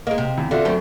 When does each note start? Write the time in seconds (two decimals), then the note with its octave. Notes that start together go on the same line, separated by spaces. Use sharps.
0.07 G#3 A#3 D#5
0.18 C3
0.38 E2
0.51 D3 F4 F#4 E5
0.65 F#2 A3 C4